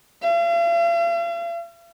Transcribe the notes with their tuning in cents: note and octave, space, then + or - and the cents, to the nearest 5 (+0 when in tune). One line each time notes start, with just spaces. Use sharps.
F5 -45